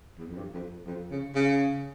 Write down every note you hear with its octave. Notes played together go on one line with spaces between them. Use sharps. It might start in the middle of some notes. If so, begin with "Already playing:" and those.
E2
F2
G2
F2
F2
C#3
C#3